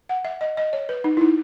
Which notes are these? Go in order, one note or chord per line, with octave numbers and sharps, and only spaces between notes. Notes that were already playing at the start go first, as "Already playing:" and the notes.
F#5
E5
D#5
D#5
C#5
B4
D#4
E4
D#4